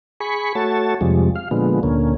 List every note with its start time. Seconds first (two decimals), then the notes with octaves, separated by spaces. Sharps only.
0.20 G#4 B5 C#6
0.55 A3 F#4 C#5 A5
1.01 F2 C3 F3 G3 G#3
1.36 F5
1.51 A#2 D3 F3 G#3 B3
1.83 D2 A#2 D3 A#3 C#4